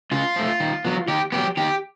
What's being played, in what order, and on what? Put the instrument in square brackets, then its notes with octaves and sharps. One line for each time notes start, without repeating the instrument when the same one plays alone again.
[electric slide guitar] C#3 F4
F3 A3
D#3
F#3 B3
D#3 G4
F#3 B3 G4
D#3 G4